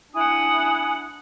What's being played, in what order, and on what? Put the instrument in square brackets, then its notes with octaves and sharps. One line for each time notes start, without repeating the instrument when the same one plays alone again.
[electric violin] D4 F#5 [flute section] E4 G#5 D#6